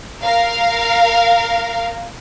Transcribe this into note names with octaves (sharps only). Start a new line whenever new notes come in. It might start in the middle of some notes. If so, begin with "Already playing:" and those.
A#4 F5